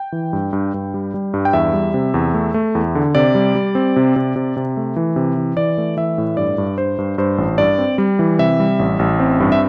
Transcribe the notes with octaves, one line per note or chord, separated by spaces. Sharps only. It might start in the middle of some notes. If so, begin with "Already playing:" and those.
Already playing: G5
E3
G2
G2
G2
G3
G3
G2
G5
E2 E5
G3
C3
E2
A3
A3
E2
D3
C3 D5
G3
G3
C4
C3
C3
C3
C3
A3
E3
C3
E3
E3 D5
A3
E3 E5
A2
G2 D5
G2
G2 C5
G2
G2 C5
A1
G2 D5
C4
G3
E3
C3 E5
G3
A1
A1
C4
G2
E5